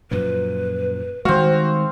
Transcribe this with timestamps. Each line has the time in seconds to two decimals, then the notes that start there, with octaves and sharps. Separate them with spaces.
0.11 F#2 A#2 F3 B4
1.25 D#3 G3 G#3 C4 F#4 F5